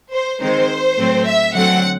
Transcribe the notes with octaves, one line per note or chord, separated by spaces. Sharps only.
C5
D#3 G#3 C4 D#4 C5
A2 F#3 A3 C4
E5
D3 F#3 A3 C4 F#5